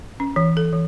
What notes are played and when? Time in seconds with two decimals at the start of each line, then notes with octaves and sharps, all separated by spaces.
0.20 C#4
0.36 E3
0.57 A4
0.73 E3